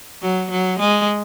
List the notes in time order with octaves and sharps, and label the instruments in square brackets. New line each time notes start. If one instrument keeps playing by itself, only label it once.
[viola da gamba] F#3
F#3
G#3